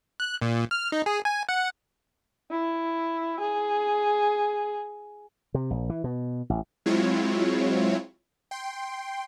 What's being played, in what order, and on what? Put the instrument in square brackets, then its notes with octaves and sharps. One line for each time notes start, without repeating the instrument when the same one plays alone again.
[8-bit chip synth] F#6
A#2
F6
D#4
G#4
G#5
F#5
[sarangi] E4
G#4
[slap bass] C3
A#1
E3
B2
A1
[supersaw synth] F#3 G#3 C4 E4 F4 C#5
G5 C6